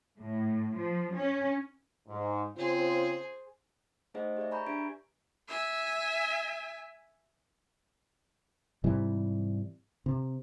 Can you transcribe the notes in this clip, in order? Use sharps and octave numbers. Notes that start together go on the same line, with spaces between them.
A2
F3
C#4
G#2
C#3 C4 F4 G#4 C5
A3 D#4 G#4 C5 D#5 F#5
G4 G#4 D5 E5
G#5 A#5 B5 C#6 G6
D4 G4 B4 E5 G#6 D7
E5 G#5
G#2 C3 E3 G3
C3